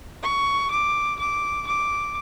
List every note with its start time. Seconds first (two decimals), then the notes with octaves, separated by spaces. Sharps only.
0.23 C#6
0.71 D6
1.19 D6
1.67 D6